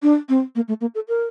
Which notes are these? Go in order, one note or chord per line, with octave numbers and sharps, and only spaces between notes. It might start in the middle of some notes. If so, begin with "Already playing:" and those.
D4
C4
A#3
A3
A#3
A4
A#4